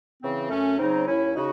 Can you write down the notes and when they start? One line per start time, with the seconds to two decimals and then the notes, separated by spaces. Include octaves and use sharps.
0.22 C#3 E3 C4
0.50 F#2 A3 C#4
0.79 C#3 F#3 C4 D#4
1.07 D#2 C#4 E4
1.35 C#3 D#4 F#4